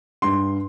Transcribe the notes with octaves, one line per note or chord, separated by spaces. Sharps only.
G2 C6